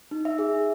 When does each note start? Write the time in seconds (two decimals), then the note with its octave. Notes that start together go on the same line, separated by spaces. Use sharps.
0.11 D#4
0.25 E5
0.39 G#4